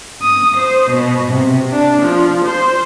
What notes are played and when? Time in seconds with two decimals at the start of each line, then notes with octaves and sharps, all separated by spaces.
0.22 D#6
0.56 C5
0.90 B2
1.32 C3
1.71 D4
2.02 F3
2.45 C5